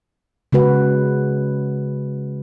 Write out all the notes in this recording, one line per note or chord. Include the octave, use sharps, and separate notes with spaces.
C#3 G#3 F#4 B4